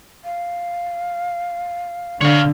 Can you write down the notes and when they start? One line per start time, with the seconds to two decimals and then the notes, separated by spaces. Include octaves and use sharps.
0.25 F5
2.21 D3 C#5 F5